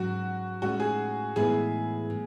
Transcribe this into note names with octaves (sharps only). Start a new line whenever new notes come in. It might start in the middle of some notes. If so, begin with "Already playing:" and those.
Already playing: G#2 F#3 C#4 F#4
A2 G#3 C#4 F#4
G#4
A2 E3 G#3 B3 E4 G#4
A2